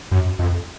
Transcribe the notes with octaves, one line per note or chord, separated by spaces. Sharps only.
F#2
F2